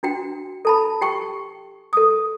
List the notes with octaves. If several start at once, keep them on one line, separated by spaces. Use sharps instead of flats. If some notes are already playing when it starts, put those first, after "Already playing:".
D4 F#4 G5
A4 A5 B5
G4 G5 C#6
A4 D#6